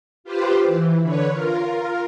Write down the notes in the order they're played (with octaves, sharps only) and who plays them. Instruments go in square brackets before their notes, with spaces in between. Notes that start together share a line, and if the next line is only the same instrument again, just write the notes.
[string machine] F4 G4 B4 C5
E3
D3 B4 C#5
F4 A#4